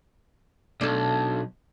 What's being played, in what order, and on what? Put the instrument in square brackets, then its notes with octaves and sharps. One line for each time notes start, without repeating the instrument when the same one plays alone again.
[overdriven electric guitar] B1 [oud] D4 A4